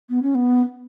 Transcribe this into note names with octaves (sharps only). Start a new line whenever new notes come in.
B3
C#4
B3